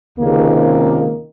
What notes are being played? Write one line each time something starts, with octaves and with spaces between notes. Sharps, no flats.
C#2 C3 D#3 A#3